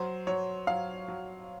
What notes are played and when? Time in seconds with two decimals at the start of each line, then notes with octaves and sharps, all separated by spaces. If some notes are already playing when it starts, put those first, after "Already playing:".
Already playing: F#3 C5
0.27 F#3 C#5
0.67 F#3 F5
1.08 F#3